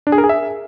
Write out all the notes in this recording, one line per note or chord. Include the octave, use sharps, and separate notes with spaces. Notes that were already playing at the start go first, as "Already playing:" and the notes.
D4
G#4
A#4
G#4
E5